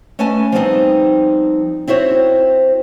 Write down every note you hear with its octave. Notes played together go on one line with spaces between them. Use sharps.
A3 C#4 B4 D#5 G#5 A5
F3 G3 A3 B3 C4 D#4
C4 E4 F#4 C5 C#5